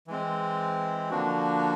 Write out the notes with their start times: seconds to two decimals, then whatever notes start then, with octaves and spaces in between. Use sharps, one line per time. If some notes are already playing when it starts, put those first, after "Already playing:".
0.07 E3 G#3 C4
1.10 D3 F3 A#3 D4 F#4